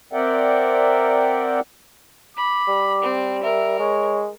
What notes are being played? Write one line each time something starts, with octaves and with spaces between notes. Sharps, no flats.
C4 A#4 D5 E5 F#5 G5
B5 D6
G3
C4
A#4 E5
G#3 C#5